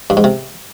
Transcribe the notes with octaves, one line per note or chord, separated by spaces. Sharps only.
G2
G#2
C3